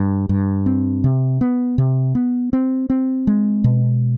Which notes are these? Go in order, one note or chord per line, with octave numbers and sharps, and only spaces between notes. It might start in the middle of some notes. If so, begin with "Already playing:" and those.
Already playing: G2
G2
C4
C3
B3
C3
B3
C4
C4
G#3
B2